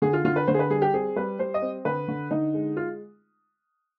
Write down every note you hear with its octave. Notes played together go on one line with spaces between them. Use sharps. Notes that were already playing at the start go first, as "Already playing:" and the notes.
D3 G#4
F4
D3 F4
B4
D3 C5
G#4
B4
G3 G#4
G4
C4 G#4
G3 B4
G3 C5
D#5
C4
D3 B4
D3
D3 D#4
G#3
F4